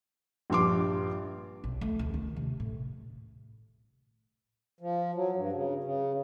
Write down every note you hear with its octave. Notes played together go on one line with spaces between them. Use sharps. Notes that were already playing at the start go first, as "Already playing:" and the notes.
A#1 G2 C6 D6
B1
A3
D2
D#3
C3
A2
F3
F#3
G2
C#3
C#3